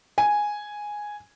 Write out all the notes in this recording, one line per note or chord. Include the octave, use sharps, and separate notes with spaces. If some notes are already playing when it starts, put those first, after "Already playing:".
G#5